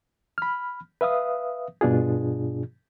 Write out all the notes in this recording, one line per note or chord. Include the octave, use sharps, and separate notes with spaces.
B5 F6
B4 E5 F5 D#6
G2 B2 D4 F4 G#4